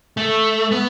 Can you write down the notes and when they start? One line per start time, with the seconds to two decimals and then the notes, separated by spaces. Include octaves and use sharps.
0.17 A3
0.72 B3